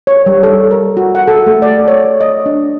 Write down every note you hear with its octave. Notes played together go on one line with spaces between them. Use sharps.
C#5
G3
A4
A#4
F#4
F#5
A4
A3
D5
C#5
D#5
D4